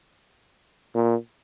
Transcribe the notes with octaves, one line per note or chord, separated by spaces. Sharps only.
A#2